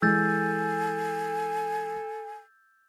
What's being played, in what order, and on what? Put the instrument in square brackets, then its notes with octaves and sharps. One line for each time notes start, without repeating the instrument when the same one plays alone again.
[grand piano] E3 G#3 [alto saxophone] A4 [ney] G#5 [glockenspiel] E6 G6 A6